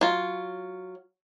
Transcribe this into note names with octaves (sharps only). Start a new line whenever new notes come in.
F#3 F4